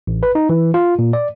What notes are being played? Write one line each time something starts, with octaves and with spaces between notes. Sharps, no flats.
A1
B4
D#4
E3
F4
A#2
D5